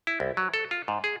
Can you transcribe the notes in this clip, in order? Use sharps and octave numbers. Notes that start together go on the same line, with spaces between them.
E4
C2
F#3
A4
F4
G#2
G#4